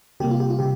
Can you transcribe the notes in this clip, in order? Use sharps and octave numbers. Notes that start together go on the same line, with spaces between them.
C3 G3 A#3 G4
F4
G4
F4
C3 G4